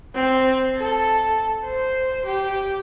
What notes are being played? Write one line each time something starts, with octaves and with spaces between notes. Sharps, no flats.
C4
A4
C5
G4